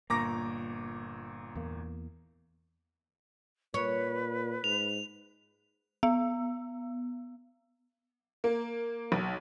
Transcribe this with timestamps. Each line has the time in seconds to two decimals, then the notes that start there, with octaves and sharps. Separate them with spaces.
0.10 G1 A#2 A#3 A#5 C#6 D6 A#6
1.56 E2 A#3
3.74 A#2 B4 C#5
4.64 G#2 F7
6.03 B3
8.44 A#3
9.12 B1